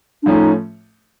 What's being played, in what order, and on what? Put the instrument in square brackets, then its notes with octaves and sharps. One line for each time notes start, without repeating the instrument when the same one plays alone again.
[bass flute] D4
[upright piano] A2 F3 A3 C#4 [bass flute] D#4